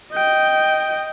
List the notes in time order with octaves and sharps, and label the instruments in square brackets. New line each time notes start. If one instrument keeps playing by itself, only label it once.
[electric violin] D#5 G5